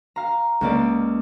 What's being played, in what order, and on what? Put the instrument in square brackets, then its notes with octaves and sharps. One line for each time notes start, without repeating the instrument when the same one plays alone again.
[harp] F5 A#5
C#2 A#3 D5